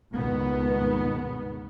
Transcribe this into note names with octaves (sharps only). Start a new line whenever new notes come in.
C#2 G2 B2 D#3 B3